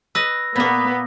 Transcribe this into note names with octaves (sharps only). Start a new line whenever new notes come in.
B4 D#5 E6 A#6
A#2 A#3 B3 B5